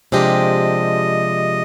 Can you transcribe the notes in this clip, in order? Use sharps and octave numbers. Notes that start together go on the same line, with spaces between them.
C3 F3 G#3 D4 G4 D#5